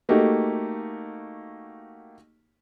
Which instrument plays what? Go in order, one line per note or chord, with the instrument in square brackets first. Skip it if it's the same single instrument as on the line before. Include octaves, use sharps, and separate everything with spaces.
[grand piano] A3 A#3 D#4 F#4 G4